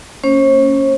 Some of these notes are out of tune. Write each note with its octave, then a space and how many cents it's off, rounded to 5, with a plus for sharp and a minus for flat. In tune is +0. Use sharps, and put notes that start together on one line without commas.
A#3 -25 C#4 +0 C5 +45